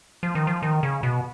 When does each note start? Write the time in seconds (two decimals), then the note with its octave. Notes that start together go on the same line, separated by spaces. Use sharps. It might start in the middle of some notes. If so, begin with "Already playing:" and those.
0.23 F3
0.35 D#3
0.47 F3
0.63 D#3
0.83 C#3
1.03 B2